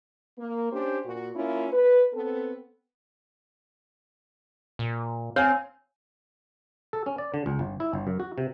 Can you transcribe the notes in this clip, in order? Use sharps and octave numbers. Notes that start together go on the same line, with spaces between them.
A#3
C#4 D4 G4 C5
A#2 F#4
A#3 C#4 E4 F4
B4
B3 C4 A4
A#2
C4 C#5 F5 G#5
A4
C#4
D5
D3
C#2
G1
E4
G1
F#2
F#4
C3